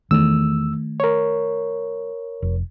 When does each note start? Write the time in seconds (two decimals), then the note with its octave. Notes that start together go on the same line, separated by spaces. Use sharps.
0.11 E2 D#3 A3 E6
1.00 A#4 C#5
2.42 F1